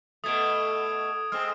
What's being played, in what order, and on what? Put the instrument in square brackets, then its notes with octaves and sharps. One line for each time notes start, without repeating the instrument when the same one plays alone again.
[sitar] B2 A3 [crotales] D#6 G#6 D7
[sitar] G#3 C4 [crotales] F6